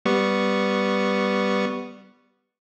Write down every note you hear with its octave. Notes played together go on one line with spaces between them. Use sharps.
G3 B3 C#6